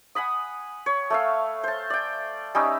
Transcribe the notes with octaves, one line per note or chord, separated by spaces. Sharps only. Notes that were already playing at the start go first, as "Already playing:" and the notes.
F#5 G#5 B5 D#6
C#5
A3 E5 F5
C5 A5
D5 G5
G3 C#4 D#4 E5